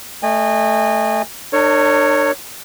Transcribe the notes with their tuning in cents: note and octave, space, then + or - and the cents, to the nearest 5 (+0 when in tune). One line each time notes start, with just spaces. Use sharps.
A3 +0 D#5 -30 G#5 -30
D4 +40 A#4 -35 C#5 +0